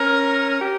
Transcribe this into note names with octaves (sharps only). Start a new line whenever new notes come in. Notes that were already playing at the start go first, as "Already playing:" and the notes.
Already playing: C#4 A#4
G4